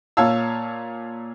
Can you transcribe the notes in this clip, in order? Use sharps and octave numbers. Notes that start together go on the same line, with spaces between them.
A#2 C#5 F5 A5 E6